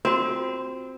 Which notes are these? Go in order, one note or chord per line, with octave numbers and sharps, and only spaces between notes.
C4 F4 F#4